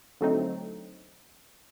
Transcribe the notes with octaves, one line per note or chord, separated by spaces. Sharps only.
D3 F#3 A3 C4 D#4